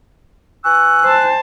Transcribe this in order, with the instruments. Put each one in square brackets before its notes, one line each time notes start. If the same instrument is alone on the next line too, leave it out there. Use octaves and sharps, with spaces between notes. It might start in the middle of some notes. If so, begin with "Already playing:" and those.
[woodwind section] E3 C#6 E6 [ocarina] G#5 [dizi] F#6
[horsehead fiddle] C5 A5